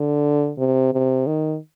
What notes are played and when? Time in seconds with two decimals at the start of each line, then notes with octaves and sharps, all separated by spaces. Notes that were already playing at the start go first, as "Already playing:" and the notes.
Already playing: D3
0.58 C3
0.93 C3
1.26 D#3